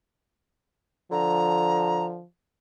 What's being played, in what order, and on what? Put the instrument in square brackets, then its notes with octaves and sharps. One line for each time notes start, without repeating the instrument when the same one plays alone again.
[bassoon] D3 [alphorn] F3 [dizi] A#5